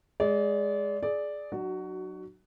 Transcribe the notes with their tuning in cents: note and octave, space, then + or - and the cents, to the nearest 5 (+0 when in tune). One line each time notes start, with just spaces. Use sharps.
G#3 +0 D5 -30
G#4 +20 D5 +0
F#3 +0 D#4 -45 F#4 +15